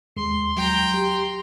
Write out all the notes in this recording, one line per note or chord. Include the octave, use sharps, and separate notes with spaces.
D#2 G#3 C6
F#3 G5 A#5
G4